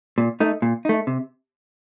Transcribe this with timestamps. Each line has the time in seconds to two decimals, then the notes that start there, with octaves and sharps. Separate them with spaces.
0.18 A#2
0.40 A3 D#4
0.62 A#2
0.85 A3 D#4
1.07 C3